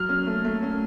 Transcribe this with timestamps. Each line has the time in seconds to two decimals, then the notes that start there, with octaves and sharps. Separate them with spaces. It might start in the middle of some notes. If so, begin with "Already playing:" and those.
Already playing: F#3 F6
0.09 C#4
0.27 A3
0.45 A3
0.62 C#4